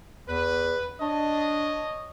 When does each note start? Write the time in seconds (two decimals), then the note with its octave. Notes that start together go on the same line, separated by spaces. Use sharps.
0.28 E2 B4
1.01 D4 C#5 D#5